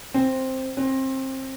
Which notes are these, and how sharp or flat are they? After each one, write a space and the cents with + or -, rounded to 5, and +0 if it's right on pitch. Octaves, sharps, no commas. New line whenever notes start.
C4 +5
C4 +25